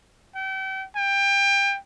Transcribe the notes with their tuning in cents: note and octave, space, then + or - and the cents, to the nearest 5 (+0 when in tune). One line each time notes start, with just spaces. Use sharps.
G5 -35
G5 +25